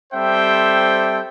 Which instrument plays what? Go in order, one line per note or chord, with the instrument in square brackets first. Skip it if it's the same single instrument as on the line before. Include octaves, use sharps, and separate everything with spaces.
[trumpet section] G3 C4 A4 C5 E5 G5